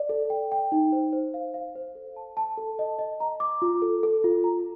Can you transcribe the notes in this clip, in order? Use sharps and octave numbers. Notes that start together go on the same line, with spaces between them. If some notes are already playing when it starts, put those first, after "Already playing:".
Already playing: D5
A4
G5
G5
D#4
C5
C5
F5
F5
C5
A4
A5
A5
A4
D#5
D#5
A#5
D6
F4
A4
A4
F4
A#5